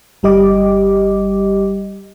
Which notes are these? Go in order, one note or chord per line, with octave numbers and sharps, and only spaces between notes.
G1 G3 G4 D#5 D6